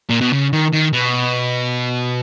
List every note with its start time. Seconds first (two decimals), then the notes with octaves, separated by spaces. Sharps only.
0.10 A#2
0.21 B2
0.33 C#3
0.53 D#3
0.73 D#3
0.93 B2